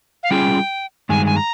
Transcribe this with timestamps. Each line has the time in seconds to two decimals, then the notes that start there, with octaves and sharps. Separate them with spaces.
0.23 F5
0.31 G3 C#4 F4 G#4 G5
1.09 G2 D#3 G#3 G#5
1.26 G#5
1.36 A#5